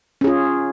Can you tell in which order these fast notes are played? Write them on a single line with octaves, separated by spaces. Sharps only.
C#4 G#4 F4